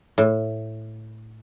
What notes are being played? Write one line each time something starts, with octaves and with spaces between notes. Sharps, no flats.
A2